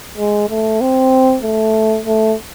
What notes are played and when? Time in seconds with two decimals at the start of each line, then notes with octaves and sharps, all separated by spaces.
0.17 G#3
0.50 A3
0.81 C4
1.43 A3
2.06 A3